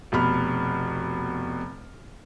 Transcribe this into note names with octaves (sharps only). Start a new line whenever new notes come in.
F1 B2 B5 F6